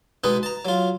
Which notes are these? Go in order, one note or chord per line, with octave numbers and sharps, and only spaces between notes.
B2 G#3 D#4 B4
A5 A#5
F#3 F4